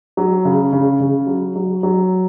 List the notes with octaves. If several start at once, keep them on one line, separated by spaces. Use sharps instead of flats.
F#3
C#3
C#3
C#3
F#3
F#3
F#3